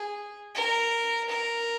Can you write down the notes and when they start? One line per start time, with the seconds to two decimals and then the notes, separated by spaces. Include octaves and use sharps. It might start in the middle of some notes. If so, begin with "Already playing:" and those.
Already playing: G#4
0.55 A#4
1.29 A#4